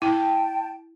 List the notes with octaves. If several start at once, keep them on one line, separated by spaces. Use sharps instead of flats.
E4 G5 A5